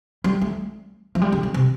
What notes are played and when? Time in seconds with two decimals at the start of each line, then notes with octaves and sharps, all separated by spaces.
0.24 G3
0.42 A3
1.15 F3
1.22 G3
1.32 D3
1.43 D3
1.54 C3